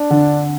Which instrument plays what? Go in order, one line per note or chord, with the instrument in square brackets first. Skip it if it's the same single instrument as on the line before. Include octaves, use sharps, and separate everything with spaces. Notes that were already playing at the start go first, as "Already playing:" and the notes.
Already playing: [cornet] D4
[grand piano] D3